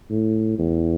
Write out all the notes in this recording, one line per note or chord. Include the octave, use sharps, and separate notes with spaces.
A2
E2